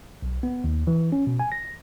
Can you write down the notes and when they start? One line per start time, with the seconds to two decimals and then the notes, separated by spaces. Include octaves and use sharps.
0.22 B1
0.43 B3
0.64 D#2
0.87 E3
1.12 C#4
1.27 B2
1.39 G#5
1.52 A#6